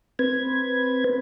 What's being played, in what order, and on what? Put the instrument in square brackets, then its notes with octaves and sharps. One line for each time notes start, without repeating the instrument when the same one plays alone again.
[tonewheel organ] C4 B4 G#6